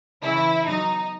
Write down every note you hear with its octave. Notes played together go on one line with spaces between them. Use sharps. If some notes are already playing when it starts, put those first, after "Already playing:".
C#3 E3 E4
B2 F#3 D#4